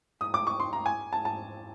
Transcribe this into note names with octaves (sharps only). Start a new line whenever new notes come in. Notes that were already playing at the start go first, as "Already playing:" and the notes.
D#6
D6
C#6
C6
A#5
G#5
A5
A5